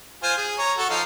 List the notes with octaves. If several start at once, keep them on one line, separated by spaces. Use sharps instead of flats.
F4 C5 G#5
G#4
C#5 A#5
F#4 A4
F3 D#4 F5